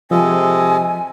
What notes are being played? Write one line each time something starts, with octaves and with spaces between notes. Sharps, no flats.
C3 F3 G#3 A4 D#5 G#5